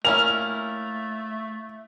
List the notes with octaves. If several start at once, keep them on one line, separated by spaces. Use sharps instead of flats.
A3 A#3 C#4 E4 F7